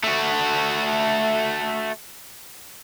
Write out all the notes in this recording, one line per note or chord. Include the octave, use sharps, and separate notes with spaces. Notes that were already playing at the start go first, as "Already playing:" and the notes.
A3 F#4